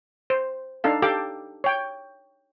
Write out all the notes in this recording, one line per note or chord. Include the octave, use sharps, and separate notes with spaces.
C5
D4 D#4 A4 F5
G4 A4 F5 G5 D6
C#5 G5